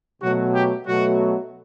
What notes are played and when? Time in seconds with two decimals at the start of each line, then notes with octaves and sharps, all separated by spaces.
0.21 B2 F#3 A3 F#4
0.53 G4
0.86 B2 F#3 A3 F#4